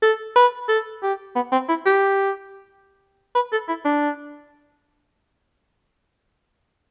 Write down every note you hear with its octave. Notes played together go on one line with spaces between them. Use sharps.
A4
B4
A4
G4
B3
C4
E4
G4
B4
A4
E4
D4